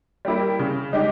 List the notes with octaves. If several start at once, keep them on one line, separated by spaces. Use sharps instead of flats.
G3 A#3 E4
C#3
G#3 D#4 G4